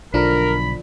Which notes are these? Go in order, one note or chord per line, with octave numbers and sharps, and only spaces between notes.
B1 D3 F3 D4 A#4 B5